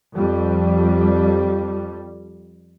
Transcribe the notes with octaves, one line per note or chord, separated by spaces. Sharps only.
F2 G3